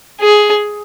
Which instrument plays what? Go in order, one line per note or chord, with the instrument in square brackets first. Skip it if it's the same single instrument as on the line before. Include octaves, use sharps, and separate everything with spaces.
[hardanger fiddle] G#4